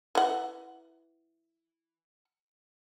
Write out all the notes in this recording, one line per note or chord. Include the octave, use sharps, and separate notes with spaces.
E3 F#5